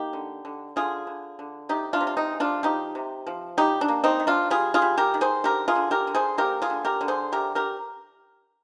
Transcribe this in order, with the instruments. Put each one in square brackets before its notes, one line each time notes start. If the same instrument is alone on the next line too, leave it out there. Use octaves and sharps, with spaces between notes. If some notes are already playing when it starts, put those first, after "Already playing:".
Already playing: [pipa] A#3 D#4 G4
D3
D3
D3 F4 G#4
D3
D3
C3 D#4 G4
D4 F4
C3
F4
C4 D#4
G#3
D4 F4
F3 D#4 G4
C3
F3
G3 D#4 G4
D4
A#3
C4 D#4
D#3
D4 F4
G3 F4 G#4
F4 G#4
G3
G4 A#4
D#3
G#4 C5
D3 G4 A#4
F4 G#4
D3
G4 A#4
D3
G#4 C5
A#3 G4 A#4
F4 G#4
D3
G4 A#4
D3
G#4 C5
C3 G4 A#4
G4 A#4